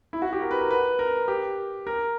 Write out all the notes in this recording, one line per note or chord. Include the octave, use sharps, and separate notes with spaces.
E4
F#4
G4
A#4
B4
A#4
B4
A#4
G4
A#4